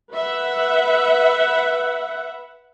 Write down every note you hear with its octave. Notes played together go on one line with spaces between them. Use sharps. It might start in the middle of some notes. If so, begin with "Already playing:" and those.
B4 E5 F#5